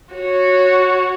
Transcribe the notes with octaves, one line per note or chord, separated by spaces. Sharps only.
F#4 C#5